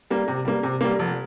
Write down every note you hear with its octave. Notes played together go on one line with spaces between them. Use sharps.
G3 A#3
C3
G3 A#3
C3
G3 A#3
F1